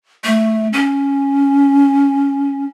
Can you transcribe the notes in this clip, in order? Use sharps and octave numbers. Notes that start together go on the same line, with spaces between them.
A3
C#4